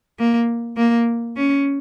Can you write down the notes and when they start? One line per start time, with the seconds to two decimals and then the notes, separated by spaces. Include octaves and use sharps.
0.19 A#3
0.77 A#3
1.37 C#4